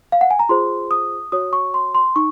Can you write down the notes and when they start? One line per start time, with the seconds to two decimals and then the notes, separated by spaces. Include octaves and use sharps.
0.12 F5
0.21 F#5
0.31 G#5
0.39 A#5
0.49 F4 G#4 C5 C6
0.91 D#6
1.32 F#4 C#5 D#6
1.53 C#6
1.74 C6
1.95 C6
2.16 D#4 C#6